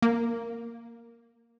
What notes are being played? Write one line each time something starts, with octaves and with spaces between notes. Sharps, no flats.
A#3